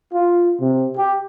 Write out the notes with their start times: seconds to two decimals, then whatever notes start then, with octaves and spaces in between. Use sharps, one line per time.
0.13 F4
0.60 C3
0.97 G4